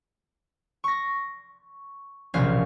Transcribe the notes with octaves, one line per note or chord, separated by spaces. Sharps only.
C#6 A#6
E1 A#1 C3 C#4 F5 G#6